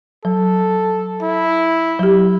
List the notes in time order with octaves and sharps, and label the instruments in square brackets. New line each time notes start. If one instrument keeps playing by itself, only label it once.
[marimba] F#3 [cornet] A4
[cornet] E4
[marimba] F#3 G4